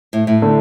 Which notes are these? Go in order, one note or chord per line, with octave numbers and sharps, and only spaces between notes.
A2
A2
D3 A3